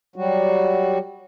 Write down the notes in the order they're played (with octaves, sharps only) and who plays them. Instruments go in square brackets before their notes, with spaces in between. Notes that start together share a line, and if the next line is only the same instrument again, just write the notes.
[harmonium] F#3 G3 F#4